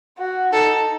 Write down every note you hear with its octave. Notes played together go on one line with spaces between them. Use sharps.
F#4
D#4 A4